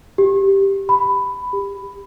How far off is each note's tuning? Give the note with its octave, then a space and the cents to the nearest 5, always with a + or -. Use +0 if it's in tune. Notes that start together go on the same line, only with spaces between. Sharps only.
G4 +0
B5 +10
G4 +20